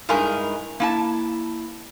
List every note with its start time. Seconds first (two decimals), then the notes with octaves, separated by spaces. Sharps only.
0.09 G2 G#3 D#4 E4 A#4 G#5
0.80 A#3 E4 A5